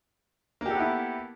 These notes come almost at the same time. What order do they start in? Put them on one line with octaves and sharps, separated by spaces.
A#3 G4 A4 B3 E4